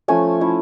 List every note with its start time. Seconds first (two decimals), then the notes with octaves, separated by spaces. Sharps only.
0.08 F3 A3 C#4 G#5
0.40 A3 C#4 E4